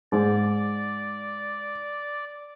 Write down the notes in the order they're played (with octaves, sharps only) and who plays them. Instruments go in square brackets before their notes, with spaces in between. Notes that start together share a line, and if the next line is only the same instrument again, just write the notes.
[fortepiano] G#2 [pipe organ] D5